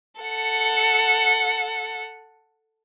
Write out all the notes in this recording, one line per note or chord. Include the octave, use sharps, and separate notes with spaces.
A4 F#5